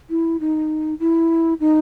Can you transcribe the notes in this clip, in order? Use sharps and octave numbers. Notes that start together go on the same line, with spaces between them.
E4
D#4
E4
D#4